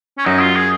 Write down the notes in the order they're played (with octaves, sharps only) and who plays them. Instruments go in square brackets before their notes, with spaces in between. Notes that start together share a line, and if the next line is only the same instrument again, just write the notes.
[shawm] C#4
[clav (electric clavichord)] F#2 F#3 [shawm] D#4
[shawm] F4
G#4